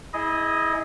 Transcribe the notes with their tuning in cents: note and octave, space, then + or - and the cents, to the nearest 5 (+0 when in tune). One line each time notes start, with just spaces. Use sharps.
E4 -25 G#4 +0 D#5 +0